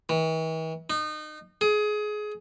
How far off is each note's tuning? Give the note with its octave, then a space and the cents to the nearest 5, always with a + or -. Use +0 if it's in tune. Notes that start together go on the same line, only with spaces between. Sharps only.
E3 -45
D#4 -30
G#4 +20